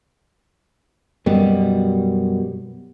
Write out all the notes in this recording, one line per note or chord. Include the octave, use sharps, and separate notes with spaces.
F#2 B2 G3